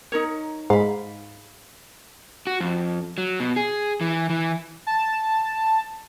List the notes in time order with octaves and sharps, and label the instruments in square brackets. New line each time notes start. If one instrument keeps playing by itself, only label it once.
[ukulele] D#4 A#4 C#5
[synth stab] G#2 [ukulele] F5 B5
[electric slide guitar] F#4
F2
F#3
B2
G#4
E3
E3
[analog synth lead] A5